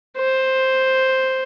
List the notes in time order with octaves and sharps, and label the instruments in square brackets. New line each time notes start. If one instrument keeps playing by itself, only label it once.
[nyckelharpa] C5